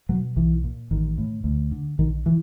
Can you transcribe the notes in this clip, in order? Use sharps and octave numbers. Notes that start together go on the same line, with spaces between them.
B2 F#3
B1 E3
A#2
A1 D#3
A2
D2
D3
A#1 D#3
E3